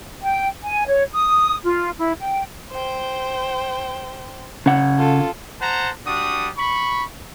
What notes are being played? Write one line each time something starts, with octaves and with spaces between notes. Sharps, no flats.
G5
G#5
C#5
D#6
F4
E4
G5
C5 G5
C#3 F#5
F4 A4
C5 F#5 A5 A#5
G3 D4 F#4 D#6
B5 C#6